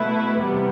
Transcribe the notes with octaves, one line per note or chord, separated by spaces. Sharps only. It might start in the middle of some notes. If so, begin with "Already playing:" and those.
Already playing: B2 A3 E4 B4
E2 C3 G3 B3